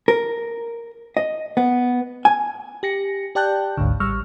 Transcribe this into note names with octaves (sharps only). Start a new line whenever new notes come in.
A#4
D#5
B3
G#5
G4 A#6 C#7
G4 D5 G5 A5 F#6 G6
G#1 D2 G#2 D3
A1 G3 C#6 E6 F6